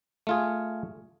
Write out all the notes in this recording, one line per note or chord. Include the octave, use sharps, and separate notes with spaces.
A3 F4 G#4